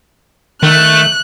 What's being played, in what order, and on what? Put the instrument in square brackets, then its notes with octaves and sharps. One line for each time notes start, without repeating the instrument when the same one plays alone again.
[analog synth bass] D#3 [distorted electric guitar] A3 [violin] F#6